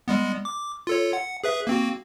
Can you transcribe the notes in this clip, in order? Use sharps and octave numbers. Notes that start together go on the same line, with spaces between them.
G3 G#3 B3
D6
F4 A4 C#5
F#5
G#4 B4 E5
A#3 C4 F#4